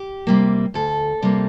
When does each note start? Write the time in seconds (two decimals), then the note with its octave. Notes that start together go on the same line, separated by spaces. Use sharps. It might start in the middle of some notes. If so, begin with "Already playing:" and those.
Already playing: G4
0.27 C3 G3 A#3
0.74 D2 A4
1.22 C3 G3 A#3